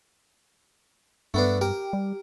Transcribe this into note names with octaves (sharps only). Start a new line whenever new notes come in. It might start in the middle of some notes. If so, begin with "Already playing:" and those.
G2 A3 B3 D4
G4 A#4
G3